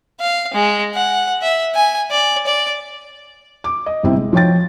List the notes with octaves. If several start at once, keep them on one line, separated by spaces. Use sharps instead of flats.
F5
G#3
F#5
E5
G#5
D5
D5
D6
D#5
G1 C3 C4 E4
G#3
F3 C#5 G5 A6